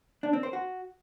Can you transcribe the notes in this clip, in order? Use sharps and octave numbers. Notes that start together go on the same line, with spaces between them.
D4
C4
C5
F#4